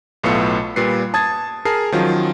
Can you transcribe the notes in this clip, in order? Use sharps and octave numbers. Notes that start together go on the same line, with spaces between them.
B1 A2 B3 F4 A4 C#7
A#2 G3 B4 C7
A5 D#6 G#6 A6
G#4 A#4 A5 C7
D#3 F3 F#3 C#4 F4